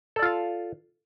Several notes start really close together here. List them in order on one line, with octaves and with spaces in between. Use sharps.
A4 D5 F4 F5